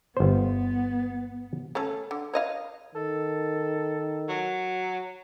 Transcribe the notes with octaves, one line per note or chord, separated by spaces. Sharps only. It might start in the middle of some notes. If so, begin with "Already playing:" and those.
G1 B3 C5
A3 C#4 A4
D3
C#5 D#5 F5
D#3 A4
F#3